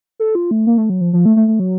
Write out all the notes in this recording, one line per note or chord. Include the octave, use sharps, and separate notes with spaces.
A4
F4
A3
A#3
A3
F#3
F3
F3
A3
A3
A3
F#3